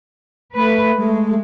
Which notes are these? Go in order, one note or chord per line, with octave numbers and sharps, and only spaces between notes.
A3 B4
G#3 A3